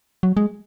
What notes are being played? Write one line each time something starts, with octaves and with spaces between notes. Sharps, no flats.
F#3
G#3